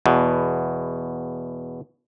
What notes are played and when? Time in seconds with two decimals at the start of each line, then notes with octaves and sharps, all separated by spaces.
0.06 E2 B2